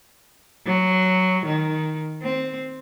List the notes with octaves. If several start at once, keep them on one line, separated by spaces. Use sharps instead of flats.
F#3
D#3
C4